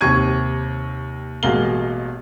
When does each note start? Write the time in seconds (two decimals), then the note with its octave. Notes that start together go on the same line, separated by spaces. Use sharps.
0.01 D#2 C3 G4 C#6 G#6 D#7
1.43 A1 B2 G#3 A#3 F5 G7